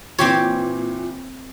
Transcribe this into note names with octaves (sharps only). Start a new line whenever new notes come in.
A#2 E3 C4 G4 C#5